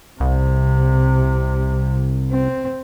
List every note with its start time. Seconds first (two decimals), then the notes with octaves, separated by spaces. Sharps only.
0.20 C2 C3
2.32 C4